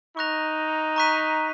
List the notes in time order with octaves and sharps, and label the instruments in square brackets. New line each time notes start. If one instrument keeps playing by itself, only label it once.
[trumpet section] D#4 [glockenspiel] C#6 F#6 A#6 F7
[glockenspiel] A#5 C#6 F#6 B6 D#7